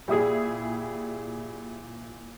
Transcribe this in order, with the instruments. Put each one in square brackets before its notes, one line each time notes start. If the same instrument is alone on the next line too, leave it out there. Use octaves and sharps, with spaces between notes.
[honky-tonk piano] A#2 E4 D#6 [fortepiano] G3 G#4